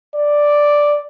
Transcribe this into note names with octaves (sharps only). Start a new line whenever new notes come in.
D5